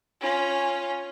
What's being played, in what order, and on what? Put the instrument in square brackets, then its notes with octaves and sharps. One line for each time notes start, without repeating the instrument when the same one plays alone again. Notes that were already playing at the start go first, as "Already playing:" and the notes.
[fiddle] C#4 F4